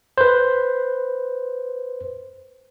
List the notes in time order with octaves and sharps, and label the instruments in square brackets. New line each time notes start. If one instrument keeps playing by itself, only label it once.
[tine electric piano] B4 C5